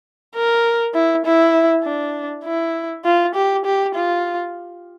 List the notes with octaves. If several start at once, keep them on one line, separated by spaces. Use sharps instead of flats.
A#4
E4
E4
D4
E4
F4
G4
G4
F4